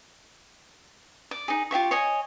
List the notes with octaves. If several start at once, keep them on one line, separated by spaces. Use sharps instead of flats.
D5
D#4 G#4
F4 G4 E5 C#6
C#5 D#5 G#5